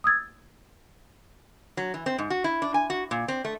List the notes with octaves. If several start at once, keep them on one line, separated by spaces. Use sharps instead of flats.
D#6 E6 G#6 A6
F#3
E3
C4
G#2
F#4
E4
D4
G#5
F#4
A#2
C4
A3